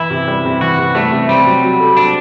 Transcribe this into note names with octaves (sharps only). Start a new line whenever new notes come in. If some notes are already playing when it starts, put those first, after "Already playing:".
Already playing: E3 E4
C3
G3
C3
E3 F#4
C3
G3 A3
C3
G3 C4
F#3
F#4
A4
C4 D4